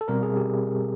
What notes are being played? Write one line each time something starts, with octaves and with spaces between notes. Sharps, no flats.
A4
B2 G3 C4 A#4
G#4
G4